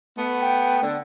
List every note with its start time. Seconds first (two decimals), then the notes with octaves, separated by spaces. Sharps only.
0.17 A3 B3
0.41 G5
0.82 D3